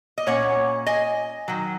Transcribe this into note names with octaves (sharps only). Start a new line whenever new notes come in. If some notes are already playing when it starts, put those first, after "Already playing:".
D#5
A#2 A#3 C#4 C#5 F#5
D#5 G#5
D#3 F#3